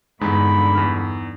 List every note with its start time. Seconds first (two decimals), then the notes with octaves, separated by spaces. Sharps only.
0.21 E2 G2 D3 G#3 D#4 B5
0.75 E2 D#4 F6